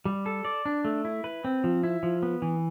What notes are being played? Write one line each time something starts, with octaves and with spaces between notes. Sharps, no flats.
G3
A4
D5
D4
A3
E4
B4
C4
F3
E4
F3
B3
E3